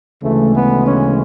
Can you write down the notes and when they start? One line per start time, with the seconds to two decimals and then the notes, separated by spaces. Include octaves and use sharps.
0.22 D2 C#3 E3 G#3 A3
0.53 B3
0.84 C#4